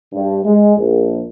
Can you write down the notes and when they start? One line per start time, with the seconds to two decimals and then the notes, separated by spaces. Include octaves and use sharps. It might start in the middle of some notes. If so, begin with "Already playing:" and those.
0.12 G2
0.45 G#3
0.77 A#1